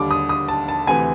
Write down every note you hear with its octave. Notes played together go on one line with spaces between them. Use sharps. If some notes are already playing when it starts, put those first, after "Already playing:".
Already playing: D#2 D3 G3 D6
D#6
D#6
A5
A5
D2 C3 E3 G#5